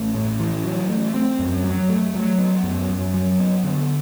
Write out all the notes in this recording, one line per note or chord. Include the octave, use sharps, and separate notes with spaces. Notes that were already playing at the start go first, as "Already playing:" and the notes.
Already playing: A1 A3
A2
E3
F#3
A3
C4
F#2
F#3
A3
F#3
B3
F#2
F#2
F#3
B3
D3